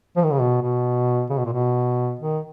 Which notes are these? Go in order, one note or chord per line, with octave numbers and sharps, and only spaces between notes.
F3
D#3
C#3
B2
B2
C#3
B2
A#2
B2
D#3